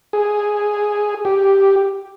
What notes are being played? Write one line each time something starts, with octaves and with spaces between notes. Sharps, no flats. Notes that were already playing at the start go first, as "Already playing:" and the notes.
G#4
G4